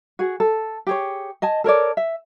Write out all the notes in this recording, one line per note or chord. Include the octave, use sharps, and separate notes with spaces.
F#4 G#4
A4
G4 G#4 C#5
D#5 G#5 A5
A4 A#4 C#5 D5
E5